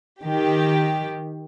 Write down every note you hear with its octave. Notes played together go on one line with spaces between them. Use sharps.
D#3 G4